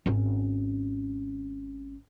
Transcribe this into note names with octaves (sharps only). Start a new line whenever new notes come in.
G#1 C#4